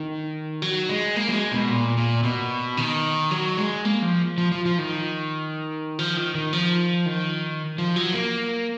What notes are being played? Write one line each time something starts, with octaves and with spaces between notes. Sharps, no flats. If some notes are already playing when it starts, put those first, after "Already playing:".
Already playing: D#3
F#3
G#3
A#3
F#3
G#3
B2
A#2
A#2
B2
D#3
F#3
G#3
A#3
F3
F3
F3
F3
D#3
F3
D#3
D#3
F3
D#3
F3
F#3
A#3